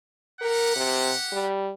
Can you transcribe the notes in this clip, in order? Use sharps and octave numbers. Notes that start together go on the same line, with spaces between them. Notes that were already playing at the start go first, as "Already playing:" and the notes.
G4 A#4 F#5
C3
G3